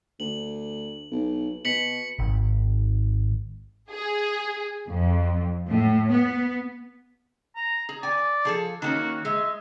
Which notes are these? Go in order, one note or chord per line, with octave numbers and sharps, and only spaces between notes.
D2 F#7
B1
B2 B6 C#7 F#7
G#1
G#4
F2
A2
B3
A#5
G#4
D5 G#5
F3 G#4 A4
D#3 A#3 C#4 F#4
G#3 E5